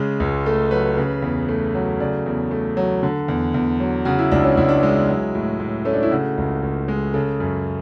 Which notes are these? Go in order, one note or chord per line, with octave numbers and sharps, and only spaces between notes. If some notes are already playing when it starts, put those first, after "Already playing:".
Already playing: C#3 G#3
C#2
A3 A4
F#3 B4
C#3
E2
A3
F#3
C#3 D5
E2
A3
F#3
D3
E2
E2
F#3
C#3 F#4
E4
C#2 D4
C#4
C#2 E4
D4
G#3 E4
F#3
A2
A2
A3 C#4
D4
E4
C#3 F#4
C#2
C#2
G#3
C#3 A4
F#2